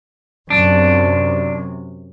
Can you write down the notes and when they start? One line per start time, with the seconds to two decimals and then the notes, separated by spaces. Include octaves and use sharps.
0.50 F#2 C3 D4